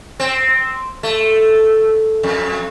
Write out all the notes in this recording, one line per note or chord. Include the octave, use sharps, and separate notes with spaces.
C4
A3
F2